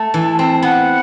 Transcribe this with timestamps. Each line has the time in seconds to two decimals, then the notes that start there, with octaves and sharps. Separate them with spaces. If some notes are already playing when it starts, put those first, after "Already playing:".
Already playing: A3 A5
0.14 E3
0.39 C4
0.63 B3 F#5